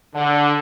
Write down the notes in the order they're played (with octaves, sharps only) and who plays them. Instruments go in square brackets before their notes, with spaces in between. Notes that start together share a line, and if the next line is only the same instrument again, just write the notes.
[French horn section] D3